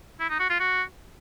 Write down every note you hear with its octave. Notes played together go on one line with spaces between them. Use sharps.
E4
D#4
F#4
F4
F#4